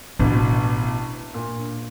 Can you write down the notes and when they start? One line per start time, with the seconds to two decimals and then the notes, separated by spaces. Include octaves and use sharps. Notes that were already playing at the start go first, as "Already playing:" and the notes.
0.19 A1 B2 D4
1.34 A#2